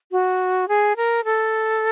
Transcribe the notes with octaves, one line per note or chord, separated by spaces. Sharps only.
F#4
G#4
A#4
A4